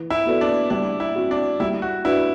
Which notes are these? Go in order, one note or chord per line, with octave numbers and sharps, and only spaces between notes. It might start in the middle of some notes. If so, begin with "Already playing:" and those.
Already playing: E3
E4
B3 F#4 A4 D5
D4
G3 D4
E4
C4 F#4
D4
G3 E4
F#4
D4 E4 F#4 B4